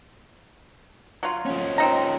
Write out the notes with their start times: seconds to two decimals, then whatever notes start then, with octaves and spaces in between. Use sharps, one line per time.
1.23 F#3 F4
1.46 F3 C#4
1.78 C4 D#4 A#5